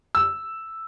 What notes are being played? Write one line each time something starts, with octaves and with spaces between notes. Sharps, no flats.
E6